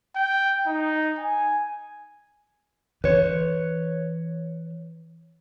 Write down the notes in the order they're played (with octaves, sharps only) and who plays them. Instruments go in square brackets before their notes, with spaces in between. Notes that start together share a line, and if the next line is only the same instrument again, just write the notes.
[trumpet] G5
D#4
G#5
[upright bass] E3 [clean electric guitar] B4 C#5